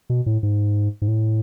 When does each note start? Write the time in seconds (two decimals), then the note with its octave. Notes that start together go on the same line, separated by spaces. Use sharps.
0.10 B2
0.26 A2
0.43 G#2
1.02 G#2
1.08 A2